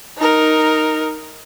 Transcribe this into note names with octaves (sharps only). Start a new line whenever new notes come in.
D#4 A#4